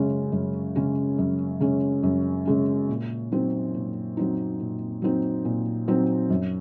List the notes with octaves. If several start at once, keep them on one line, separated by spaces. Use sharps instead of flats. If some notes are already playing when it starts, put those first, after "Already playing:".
Already playing: F#2 C#3 G#3 C#4
F#2
C#3 G#3 C#4
F#2
C#3 G#3 C#4
F#2
C#3 G#3 C#4
A#2
F#3 C4 D#4
A#2
F#3 C4 D#4
A#2
F#3 C4 D#4
A#2
F#3 C4 D#4
F#2